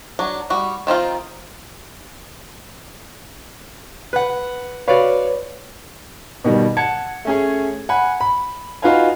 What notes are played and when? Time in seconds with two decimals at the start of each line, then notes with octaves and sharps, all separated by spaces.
0.19 F#3 D4
0.50 G3 F#4
0.87 D#3 C4 D#4 F4
4.13 B4 F#5
4.88 F#4 B4 C#5 D5 F5
6.45 B2 D#3 G3
6.77 F#5 A5 G#6 C#7
7.25 A3 C#4 G#4
7.89 F#5 G#5 B5
8.21 B5
8.82 D#4 F4 F#4 B4 F5 G#5